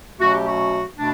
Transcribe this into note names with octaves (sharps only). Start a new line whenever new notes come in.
B2 F#3 A3 C#4 F#4
G4
F#4
B2 A3 D4